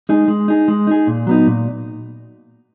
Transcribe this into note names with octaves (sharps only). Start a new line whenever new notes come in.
G#3 D#4 G#4
G#3
D#4 G#4
G#3
D#4 G#4
A#2
F#3 B3 D#4
A#2